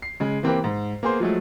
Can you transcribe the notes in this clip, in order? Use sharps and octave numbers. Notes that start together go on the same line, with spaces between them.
C7
C#3 G#3
E3 A#3 C4 G4 A#4 B4
G#2
A#3 B3 G#4 C5 C6
F3 F#3 G#3 A3